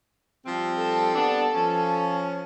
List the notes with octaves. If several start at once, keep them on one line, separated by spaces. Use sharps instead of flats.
F3 G3 C4
A4
G3 B3 D4
F3 C#4